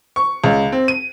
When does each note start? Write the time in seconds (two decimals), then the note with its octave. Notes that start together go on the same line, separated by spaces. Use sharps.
0.16 C#6
0.44 C#2
0.72 C4
0.88 D#7